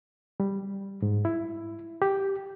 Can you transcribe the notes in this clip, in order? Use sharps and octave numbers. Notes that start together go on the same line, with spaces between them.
G3
G#2
E4
G4